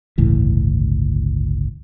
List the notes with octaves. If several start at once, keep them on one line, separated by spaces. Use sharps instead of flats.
G1 C#2 A2 E3